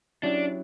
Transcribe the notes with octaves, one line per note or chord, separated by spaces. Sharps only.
F#3 C#4 D4 E4 G4